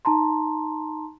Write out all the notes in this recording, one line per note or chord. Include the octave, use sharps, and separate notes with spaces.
D#4 A5 A#5 C6